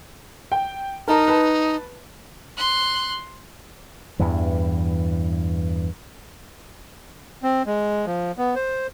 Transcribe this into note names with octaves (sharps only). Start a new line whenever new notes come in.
G5
D#4 A#4 A5 A#5
B4 A5
C6 F#6
E2 G2 E3
C4
G#3
F3
B3
C5